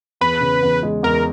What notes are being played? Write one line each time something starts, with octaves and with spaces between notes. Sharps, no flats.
E2 B4
C#3
E2
G#3
E2 A#4